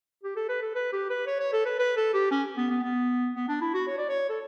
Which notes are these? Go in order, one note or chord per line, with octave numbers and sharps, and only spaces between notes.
G4
A4
B4
A4
B4
G4
B4
C#5
C#5
A4
B4
B4
A4
G4
C#4
B3
B3
B3
B3
D4
E4
F#4
C#5
D5
C#5
A4